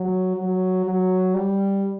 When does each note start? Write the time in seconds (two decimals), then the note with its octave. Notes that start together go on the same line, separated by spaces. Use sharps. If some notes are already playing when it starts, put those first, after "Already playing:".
Already playing: F#3
0.36 F#3
0.86 F#3
1.34 G3